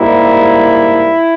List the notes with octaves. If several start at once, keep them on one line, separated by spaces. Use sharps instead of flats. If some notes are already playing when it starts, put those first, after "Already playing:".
Already playing: G#2 G3 A#3 E4